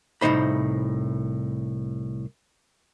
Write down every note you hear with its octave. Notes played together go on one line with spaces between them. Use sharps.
C2 A2 D#3 D#4 C5 B5